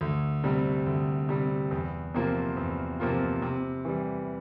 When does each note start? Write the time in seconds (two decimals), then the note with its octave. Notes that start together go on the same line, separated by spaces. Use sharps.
0.01 D2
0.44 C3 G3
0.86 D2
1.29 C3 G3
1.71 E2
2.14 C3 F3 A#3 F4
2.57 E2
3.00 C3 F3 A#3 F4
3.42 C3
3.85 E3 G3